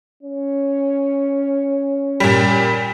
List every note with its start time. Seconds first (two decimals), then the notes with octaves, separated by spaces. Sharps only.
0.23 C#4
2.20 A#2 G3